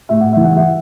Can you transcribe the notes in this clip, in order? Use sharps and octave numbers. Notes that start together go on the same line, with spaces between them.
A2 E5
F#5
E3 E5
F#5
E5